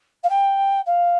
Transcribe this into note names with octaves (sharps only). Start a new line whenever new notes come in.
F5
G5
F5